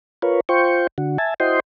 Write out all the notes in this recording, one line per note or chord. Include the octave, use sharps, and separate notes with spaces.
F4 A#4 B4 C#5
F4 C5 G5 C#6
D3 F#4
E5 G#5 A5
E4 F#4 C5 D#5 G5 C6